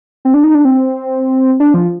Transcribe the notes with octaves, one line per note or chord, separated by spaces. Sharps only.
C4
D4
D#4
D4
C4
D4
F3